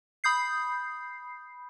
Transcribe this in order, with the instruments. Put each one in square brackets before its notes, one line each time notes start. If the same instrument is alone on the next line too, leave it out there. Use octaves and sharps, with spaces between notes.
[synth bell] B5 D#6 G6 C7